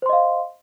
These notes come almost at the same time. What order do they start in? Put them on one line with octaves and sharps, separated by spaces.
C5 C6 D#5 F5